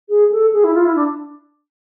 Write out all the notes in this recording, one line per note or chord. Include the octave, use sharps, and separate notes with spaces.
G#4
A4
G#4
E4
F4
E4
D4